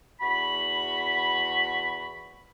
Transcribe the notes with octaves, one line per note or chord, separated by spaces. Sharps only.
E2 F#4 B5